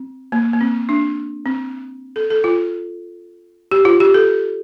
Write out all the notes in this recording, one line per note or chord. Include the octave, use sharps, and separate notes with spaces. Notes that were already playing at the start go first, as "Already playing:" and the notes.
Already playing: C4
A#3
A#3
C4
D4
C4
A4
A4
F4
G4
F4
G4
A4